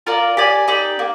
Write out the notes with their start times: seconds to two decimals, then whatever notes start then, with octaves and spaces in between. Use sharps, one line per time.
0.07 F4 A#4 D5
0.37 G4 D5 G#5
0.68 D#4 G4 D5
0.99 A#3